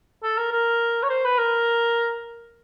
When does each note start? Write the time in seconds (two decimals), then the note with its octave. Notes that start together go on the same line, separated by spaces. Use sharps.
0.23 A4
0.38 A#4
0.52 A#4
1.03 C#5
1.09 C5
1.25 B4
1.38 A#4